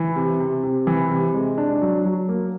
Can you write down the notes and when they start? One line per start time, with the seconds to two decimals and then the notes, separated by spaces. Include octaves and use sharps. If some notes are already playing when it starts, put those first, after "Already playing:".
Already playing: E3
0.16 C3
0.40 C3
0.64 C3
0.87 E3
1.11 C3
1.34 G#3
1.58 D4
1.82 F#3
2.05 F#3
2.29 A#3